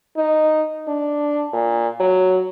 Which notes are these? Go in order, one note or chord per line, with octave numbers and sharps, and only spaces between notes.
D#4
D4
A#2
F#3